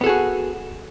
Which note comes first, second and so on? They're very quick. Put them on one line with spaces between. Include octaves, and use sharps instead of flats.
B3 A4 G#4 F#4